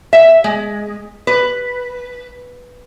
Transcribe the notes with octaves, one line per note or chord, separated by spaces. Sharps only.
E5
G#3
B4